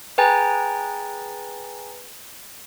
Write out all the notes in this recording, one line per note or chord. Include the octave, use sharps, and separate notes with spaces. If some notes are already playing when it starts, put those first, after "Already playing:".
G#4 B4 G5 G#5 A#5 A6